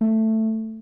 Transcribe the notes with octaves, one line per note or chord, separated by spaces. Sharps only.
A3